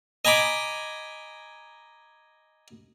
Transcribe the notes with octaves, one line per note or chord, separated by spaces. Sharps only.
D#5 G#5 A#5 B5 D6